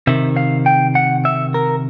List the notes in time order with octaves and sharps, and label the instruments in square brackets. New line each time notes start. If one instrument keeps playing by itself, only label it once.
[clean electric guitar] C3 D#3 E5
F5
G5
F#5
E5
A#4